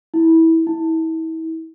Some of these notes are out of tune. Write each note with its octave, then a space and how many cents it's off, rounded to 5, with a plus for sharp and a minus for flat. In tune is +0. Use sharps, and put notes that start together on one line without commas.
E4 -20
E4 -35